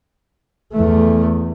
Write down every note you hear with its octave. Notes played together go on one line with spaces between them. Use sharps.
E2 A3